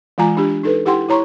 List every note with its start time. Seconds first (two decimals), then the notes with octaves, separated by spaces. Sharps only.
0.18 E3 G#3 F4 G#5 A#5
0.37 D4 G4
0.63 D#4 A4 B4
0.86 E4 G4 F#5 G5 C6
1.09 E4 C#5 A#5 C6 C#6